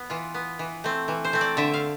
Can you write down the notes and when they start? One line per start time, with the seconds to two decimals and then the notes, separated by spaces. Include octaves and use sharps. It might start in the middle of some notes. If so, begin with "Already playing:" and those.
Already playing: B3
0.10 E3 F4
0.35 B3
0.59 E3
0.84 A3 C4
1.08 E3
1.25 C5
1.33 A3 C4
1.41 D5
1.57 D3 E5
1.74 F5